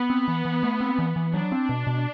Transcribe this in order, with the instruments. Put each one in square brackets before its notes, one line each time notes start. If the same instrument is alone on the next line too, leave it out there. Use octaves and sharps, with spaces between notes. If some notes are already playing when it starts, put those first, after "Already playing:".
Already playing: [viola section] B3
[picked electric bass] C4
E3
E3
A3
C4
E3
E3
[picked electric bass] F#3 [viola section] D4
[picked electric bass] C4
B2
B2